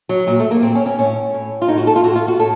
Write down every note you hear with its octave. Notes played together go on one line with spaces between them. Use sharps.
F#3
A#2 F#3
A3
A#3
A#2 C4
C#4
C#4
A2 C#4
A2
F4
A2 D#4
F#4
A4
F4
A2 F#4
F4
F#4
A2 A4